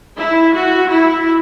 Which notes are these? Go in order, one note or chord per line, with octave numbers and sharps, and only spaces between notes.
E4
F#4
E4